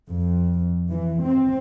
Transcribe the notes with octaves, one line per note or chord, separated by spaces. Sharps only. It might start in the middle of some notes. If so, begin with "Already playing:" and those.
F2
E3
C4